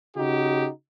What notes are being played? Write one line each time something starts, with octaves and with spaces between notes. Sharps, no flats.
C#3 D#4 F#4 G4